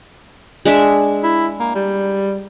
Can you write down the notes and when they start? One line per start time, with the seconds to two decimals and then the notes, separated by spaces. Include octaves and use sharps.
0.65 G#3 D4 E5
1.24 E4
1.60 A#3
1.75 G3